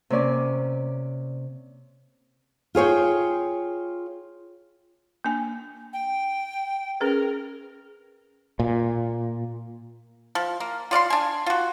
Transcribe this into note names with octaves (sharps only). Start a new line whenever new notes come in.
C3 A#3 C#4 D5
F4 G#4 C#5 G5
A#3 D4 G#5
G5
C#4 G#4 A#4 B4
A#2
F3
A#3
F4 D5 F5 C6
D4 G#5
F4 F#4